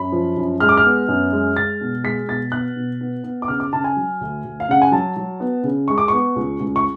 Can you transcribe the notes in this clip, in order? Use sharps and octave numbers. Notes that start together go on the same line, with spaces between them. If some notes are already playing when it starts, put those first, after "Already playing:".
Already playing: F#2 B5
F3
F#2
G#3 F6
D6
F6
B3
F#2
G#3
G#3 A6
B2
G#3 B6
B2 A6
B3 F#6
B2
B3
B3
D6
C#3 F6
D6
C#3 A5
G#5
F#3
D2
D2
F5
C#3 F#5
G#5
F#3 A5
F#3
B3
C#3
G#3 C#6
D6
B3 C#6
C#2
C#2
C#6